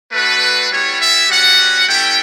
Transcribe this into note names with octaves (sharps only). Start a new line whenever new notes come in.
A3 D4 F#4 B4
G3 B3 E4 G4 C#5
E5
G3 C#4 F#4 F#5
A3 C#4 E4 G4 G5